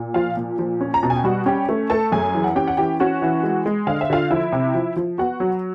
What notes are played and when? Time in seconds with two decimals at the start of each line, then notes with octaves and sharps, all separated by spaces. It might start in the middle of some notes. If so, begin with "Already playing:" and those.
Already playing: A#2
0.14 F3 F4 F5
0.37 A#2
0.59 F3
0.81 C#4
0.94 A#5
1.03 B2 A5
1.10 G#5
1.16 G5
1.24 G3 F#4 F#5
1.46 C#4 G4 G5
1.69 A3
1.90 A3 A4 A5
2.12 F#2 G#4 G#5
2.34 E3
2.44 F#5
2.56 C#4 G4 G5
2.68 F#5
2.77 E3 G4 G5
3.00 C#4 F#4 F#5
3.22 E3
3.44 G#3
3.66 G#3
3.87 D3 F5
4.01 E5
4.10 D3 F4 F5
4.31 F3 E4 E5
4.52 C3
4.75 F3
4.96 F3
5.18 B3 F#4 F#5
5.40 F#3